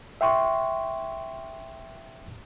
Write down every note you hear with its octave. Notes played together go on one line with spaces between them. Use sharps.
E5 G5 C6 C#6